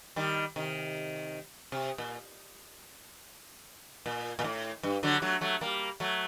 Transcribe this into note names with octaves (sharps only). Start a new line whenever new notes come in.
D#3 G3
C3 D#3
C3
A#2
A#2
A#2
A2
G2
D3 F#3
F#3 A3
F#3 A3
G3 A#3
F#3 A3